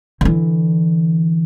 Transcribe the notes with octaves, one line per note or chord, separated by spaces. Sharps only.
D3 E3